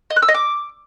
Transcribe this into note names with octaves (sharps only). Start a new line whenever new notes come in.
D#5
F#6
E6
D#5
D6